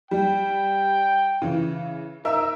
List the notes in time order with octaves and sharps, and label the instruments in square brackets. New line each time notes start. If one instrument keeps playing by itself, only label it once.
[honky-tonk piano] G3 [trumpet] G5
[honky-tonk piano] C#3 E3
[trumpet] D#4 [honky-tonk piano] A#4 E5 E6